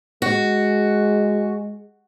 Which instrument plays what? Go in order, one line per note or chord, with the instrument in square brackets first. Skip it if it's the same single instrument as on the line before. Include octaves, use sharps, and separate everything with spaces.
[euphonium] G#3 [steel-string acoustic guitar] F#4